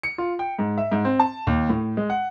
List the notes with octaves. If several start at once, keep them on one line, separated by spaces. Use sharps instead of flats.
C#7
F4
G5
G#2
E5
G#2
C4
A5
D#2
A2
G#3
F#5